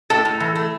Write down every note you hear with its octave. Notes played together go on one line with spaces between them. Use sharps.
A2 A4
A2
E3
A3